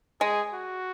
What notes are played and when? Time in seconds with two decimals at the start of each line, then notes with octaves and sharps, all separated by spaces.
0.21 G#3 G#4
0.53 F#4